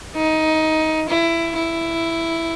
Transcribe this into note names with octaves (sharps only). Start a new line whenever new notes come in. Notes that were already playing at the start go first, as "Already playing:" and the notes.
D#4
E4
E4